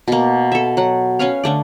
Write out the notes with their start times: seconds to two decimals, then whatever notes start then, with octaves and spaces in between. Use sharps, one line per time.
0.08 B2 A#3
0.52 A4 E5
0.77 F#3 F#5
1.19 C#4 B4 C#5 F5
1.44 D3 A3 D5